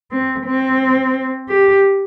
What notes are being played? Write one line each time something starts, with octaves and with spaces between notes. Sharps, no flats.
C4
C4
G4